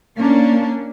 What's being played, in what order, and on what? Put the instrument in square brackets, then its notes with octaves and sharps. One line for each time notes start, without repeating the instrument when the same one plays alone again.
[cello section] A#3 C#4 D4